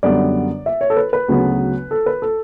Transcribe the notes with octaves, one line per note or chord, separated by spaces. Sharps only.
F#2 D3 G3 B3 D5
E5
C#5
A4
B4
B4
D2 C#3 F#3 B3
A4
B4
A4